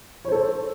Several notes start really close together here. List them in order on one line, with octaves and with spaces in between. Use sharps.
C#5 C5 A4